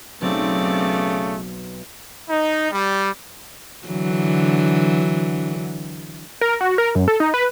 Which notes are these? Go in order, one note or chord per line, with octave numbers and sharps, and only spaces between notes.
B1 C#3 A3 C4 D5
D#4
G3
D3 E3 F#3
A#4
F#4
A#4
F#2
A4
D#4
B4